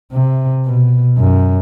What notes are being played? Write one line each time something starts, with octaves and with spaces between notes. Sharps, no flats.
C3
B2
F#2